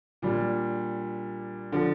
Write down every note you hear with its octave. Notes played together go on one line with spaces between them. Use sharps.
A#2 G3 D4
D3 F3